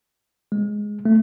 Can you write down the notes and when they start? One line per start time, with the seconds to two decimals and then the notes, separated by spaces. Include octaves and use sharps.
0.52 G#3
1.05 A3